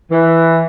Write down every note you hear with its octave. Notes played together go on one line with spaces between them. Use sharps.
E3